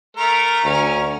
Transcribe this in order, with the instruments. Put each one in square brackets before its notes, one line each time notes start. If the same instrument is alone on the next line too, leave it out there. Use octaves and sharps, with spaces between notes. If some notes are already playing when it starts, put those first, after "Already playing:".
[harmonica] A3 A#4 [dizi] A#5
[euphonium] D2 [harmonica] C#4